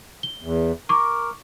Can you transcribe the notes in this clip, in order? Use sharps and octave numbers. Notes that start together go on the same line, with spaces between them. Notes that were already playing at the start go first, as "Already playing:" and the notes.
G7
E2
A#4 C#6 D6